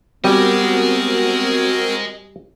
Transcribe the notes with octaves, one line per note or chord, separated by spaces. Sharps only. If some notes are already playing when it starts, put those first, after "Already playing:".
G3 B3 C4 F#4 A#4 D#5 G#5